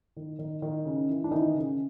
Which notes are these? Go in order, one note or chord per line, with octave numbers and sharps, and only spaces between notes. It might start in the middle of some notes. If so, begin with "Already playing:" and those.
D#3
D#3
D#3
C#3
E3
D4
D#3 E3 D#4
C#3